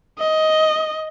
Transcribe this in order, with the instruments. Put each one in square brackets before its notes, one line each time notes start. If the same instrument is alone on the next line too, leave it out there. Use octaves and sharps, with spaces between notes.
[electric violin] D#5